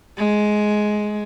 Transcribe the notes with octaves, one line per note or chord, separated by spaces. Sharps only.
G#3